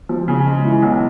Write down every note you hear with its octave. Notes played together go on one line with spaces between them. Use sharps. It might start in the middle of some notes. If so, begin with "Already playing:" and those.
F3
C#3
G#3
E3
B1